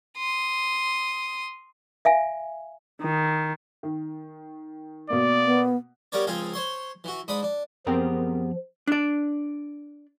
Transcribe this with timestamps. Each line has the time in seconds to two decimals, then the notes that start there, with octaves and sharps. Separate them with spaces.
0.18 C6 D#6
2.05 E5 F5 G#5
3.02 D#3
3.83 D#3
5.10 B2 A#3 D5
5.45 B3
6.12 G3 B3 A#4 B4 C#5 D5
6.27 C#2 F3 C4 G#4 F5
6.54 C5 C#5 C6
7.04 E3 F#4
7.28 G#2 D4 B5 D#6
7.43 D4
7.87 F#2 F3 B3 C4 G4 G#4 A#4
8.87 D4 D5